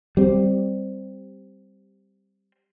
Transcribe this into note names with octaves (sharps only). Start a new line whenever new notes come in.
G3 C4